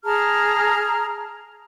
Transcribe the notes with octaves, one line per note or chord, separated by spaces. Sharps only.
G#4 A5 A#5 F6